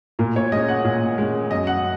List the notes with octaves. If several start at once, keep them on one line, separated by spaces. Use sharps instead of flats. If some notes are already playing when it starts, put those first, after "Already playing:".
A#2 A#4
C#5
G#3 C#4 D#5
F#5
A#2
G#3 C#4
F#2 D#5
F#5